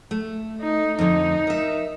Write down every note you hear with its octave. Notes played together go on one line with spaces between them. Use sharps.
A3
D#4
F2 D3 D#4
A#4 E5